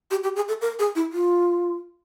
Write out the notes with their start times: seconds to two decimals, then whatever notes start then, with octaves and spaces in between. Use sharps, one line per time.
0.11 G4
0.24 G4
0.36 G#4
0.48 A4
0.61 A#4
0.79 G#4
0.95 E4
1.13 F4